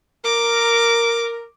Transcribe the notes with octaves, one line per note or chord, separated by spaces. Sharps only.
A#4 D6